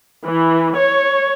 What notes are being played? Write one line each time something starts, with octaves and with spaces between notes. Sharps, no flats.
E3
C#5